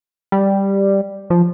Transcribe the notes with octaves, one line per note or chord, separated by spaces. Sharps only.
G3
F3